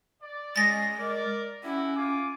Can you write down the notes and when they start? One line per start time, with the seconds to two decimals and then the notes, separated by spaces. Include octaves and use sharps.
0.21 D5
0.56 G#3 C#4 G#4 A6 A#6
0.98 A#4 D5
1.63 C#4 E4 F#4 G4
1.95 F4 G#5 D6